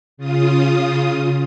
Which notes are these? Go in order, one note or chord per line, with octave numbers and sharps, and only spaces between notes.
C#3 F4 D#6